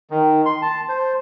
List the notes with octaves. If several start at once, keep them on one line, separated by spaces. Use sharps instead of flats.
D#3
C6
A5
C5